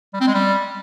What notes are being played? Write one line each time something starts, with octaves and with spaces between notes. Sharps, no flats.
G3
C4
G#3
G3